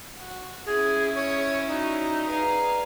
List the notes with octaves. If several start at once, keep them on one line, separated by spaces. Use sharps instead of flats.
F#4
C#4 E4 G#4
C#5
D#4 F#4 D5
G#4 B4 D5 F5 A#5